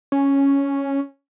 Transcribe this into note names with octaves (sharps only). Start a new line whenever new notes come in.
C#4